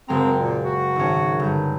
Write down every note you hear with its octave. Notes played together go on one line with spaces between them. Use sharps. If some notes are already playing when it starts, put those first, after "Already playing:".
F#1 G#3 C4 A#5
A#2
F#4
G#1 C#4
G1 G6